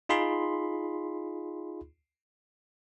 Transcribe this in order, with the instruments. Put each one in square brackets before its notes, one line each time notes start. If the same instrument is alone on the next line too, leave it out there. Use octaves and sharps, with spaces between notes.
[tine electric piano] D#4 F4 G#4 B5 C6